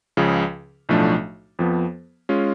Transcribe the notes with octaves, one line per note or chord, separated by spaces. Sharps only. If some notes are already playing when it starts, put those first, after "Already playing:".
C#2 C#3 F3
B1 A2 F3 A3 D4
F2 F3 B3
G#3 C#4 F4